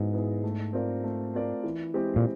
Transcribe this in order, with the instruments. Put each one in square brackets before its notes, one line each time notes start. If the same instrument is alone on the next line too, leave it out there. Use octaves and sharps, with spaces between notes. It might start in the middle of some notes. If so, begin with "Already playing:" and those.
Already playing: [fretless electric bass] G#2 [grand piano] F#3 B3 E4 G#4
[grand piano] B3 E4 G#4
A3
C4 F4 A#4 D5
A3
C4 F4 A#4 D5
E3
G#3 C4 E4 G4
[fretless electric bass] A#2